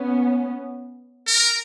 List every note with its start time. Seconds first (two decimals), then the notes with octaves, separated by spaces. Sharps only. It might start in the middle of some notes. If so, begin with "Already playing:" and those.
Already playing: B3 C#4
1.27 A#4